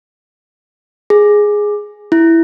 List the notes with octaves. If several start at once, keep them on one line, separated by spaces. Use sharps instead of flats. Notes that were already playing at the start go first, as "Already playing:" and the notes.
G#4
E4